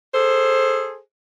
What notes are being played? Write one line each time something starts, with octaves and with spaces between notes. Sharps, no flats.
G#4 A4 C5